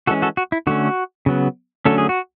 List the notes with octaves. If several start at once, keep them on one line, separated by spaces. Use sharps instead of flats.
E3 G#3 C#4 F#4 A4
F#4 A4
F#4
E4
D3 A3 C#4 F#4
C#3 F#3 B3
D3 F#3 A3 C#4 A4
G#4
F#4